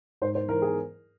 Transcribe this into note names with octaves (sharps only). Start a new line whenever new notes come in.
G#2 C5
C5
E3 A#4
G#4